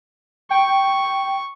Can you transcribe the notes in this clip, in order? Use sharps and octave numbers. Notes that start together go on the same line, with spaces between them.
G5 C#6